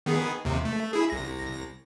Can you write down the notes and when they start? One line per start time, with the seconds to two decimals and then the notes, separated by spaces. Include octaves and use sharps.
0.06 D#3 B3 G#4
0.45 D#2 C3
0.65 A3
0.93 E4 G#4
1.10 C2 A#6